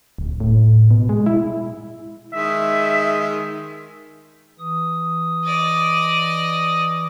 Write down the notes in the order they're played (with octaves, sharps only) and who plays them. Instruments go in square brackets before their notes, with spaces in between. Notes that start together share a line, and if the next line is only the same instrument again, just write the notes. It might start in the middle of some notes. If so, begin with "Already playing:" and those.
[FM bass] D1
A2
B2
G#3
E4
[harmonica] D#3 G#3 [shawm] E5
[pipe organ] E3 D#6
[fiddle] D5 D#5